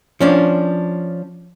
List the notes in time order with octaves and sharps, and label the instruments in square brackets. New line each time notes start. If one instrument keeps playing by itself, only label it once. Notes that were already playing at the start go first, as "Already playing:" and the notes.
[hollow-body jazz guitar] F3 C#4 D4